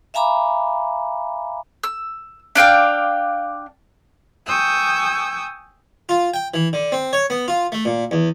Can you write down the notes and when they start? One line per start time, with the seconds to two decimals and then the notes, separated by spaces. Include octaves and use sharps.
0.14 E5 F5 G#5 A#5 B5 D6
1.84 E6
2.55 D4 D5 F5 G5
4.47 G5 G#5 C#6 D#6 E6 G6
6.09 F4
6.34 G5
6.54 E3
6.73 D3
6.92 C4
7.13 C#5
7.30 B3
7.48 F4
7.72 A3
7.85 A#2
8.11 E2